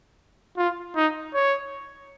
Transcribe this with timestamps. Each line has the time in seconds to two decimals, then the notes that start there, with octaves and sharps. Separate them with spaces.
0.57 F4
0.96 D#4
1.34 C#5